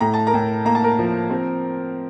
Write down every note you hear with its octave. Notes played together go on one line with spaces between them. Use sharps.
A2 A#5
A5
A#4 A#5
A2
A#3 A#5
A5
A#4 A#5
F3
C4